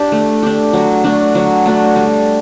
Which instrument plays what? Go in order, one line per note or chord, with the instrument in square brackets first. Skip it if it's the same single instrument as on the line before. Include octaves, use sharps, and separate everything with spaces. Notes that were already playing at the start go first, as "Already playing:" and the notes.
Already playing: [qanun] D4 G4
A3
D4 G4
F#3
A3 D4 F#4
F#3
A3 D4 F#4
G3